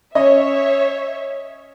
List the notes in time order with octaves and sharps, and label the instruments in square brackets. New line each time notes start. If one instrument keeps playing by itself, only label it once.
[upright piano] C#4 D#5 [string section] C#5 E5